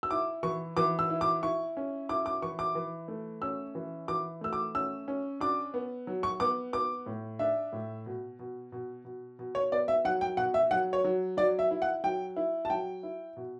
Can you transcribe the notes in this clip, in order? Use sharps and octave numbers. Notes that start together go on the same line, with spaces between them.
E6
E4 D6
E3 C#6
E3 D6
E6
E4
D6
E4 C#6
C#4
E4 D6
D6
E3 C#6
D6
E3
A3
C#4 E6
E3
E3 D6
A3 E6
D6
C#4 E6
C#4
D4 D6
B3
F#3
C#6
B3 D6
B3 D6
A2
D4 E5
A2
B2
B2
B2
B2
B2
C#5
B3 D5
E5
F#3 F#5
G5
B2 F#5
E5
F#3 F#5
C#5
F#3
F#3 D5
E5
E4
F#5
F#3 G5
E4
A5
F#3 G5
E4
B2